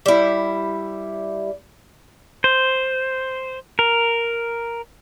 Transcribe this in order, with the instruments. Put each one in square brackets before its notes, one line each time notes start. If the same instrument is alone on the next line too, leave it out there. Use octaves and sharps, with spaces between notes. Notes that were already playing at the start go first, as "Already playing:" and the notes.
[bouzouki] G3 E4
[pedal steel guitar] C5
A#4